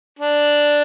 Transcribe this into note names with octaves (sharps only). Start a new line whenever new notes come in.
D4